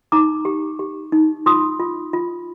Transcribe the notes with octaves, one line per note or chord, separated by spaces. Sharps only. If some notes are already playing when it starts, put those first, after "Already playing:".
D#4 A#5 D6
G4
G4
D#4
F4 C6 D#6
F4
F4